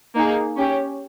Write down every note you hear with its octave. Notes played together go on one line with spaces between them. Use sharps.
A#3 D#4 G#4
C#4 G4